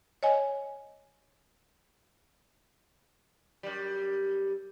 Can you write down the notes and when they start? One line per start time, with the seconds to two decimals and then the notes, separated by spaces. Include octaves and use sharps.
0.23 C#5 D#5 G#5
3.63 F#2 G3